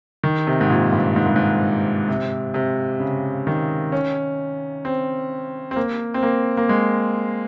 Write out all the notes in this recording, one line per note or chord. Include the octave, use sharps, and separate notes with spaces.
D#3
C3
G#2
A#2
G2
G#2
G2
G#2
C3
C3
C#3
D#3
C#4
C4
C4
A#3
C4
A#3
A#3
G#3